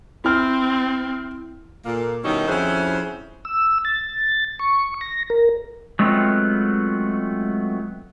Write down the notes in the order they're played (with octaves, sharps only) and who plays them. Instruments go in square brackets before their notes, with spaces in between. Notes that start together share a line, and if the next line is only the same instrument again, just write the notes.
[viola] C4 [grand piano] E4 F6
[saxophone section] A#2 A#3 A4
B2 D#3 G3 C#4 D#4 E4
F2 C#4 E4 F#4 G#4 C5
[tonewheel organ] E6
A6
C#6
A#6
A#4
[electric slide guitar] F#3 G#3 A3 B3 C4 F4